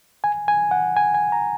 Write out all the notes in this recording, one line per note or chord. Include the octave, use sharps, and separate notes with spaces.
G#5
G#5
F#5
G#5
G#5
A#5